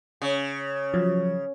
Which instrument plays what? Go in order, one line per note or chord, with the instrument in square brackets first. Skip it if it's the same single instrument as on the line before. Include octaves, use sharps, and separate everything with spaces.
[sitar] C#3
[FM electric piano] F3 F#3